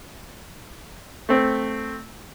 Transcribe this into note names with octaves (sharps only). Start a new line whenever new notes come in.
A3 C4